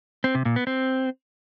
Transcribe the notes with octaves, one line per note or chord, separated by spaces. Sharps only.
C4
C3
A#2
B3
C4